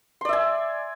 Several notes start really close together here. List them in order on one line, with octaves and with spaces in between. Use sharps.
C6 D5 E5 G#5